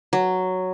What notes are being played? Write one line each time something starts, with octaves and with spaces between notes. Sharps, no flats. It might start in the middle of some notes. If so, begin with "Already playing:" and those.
F#3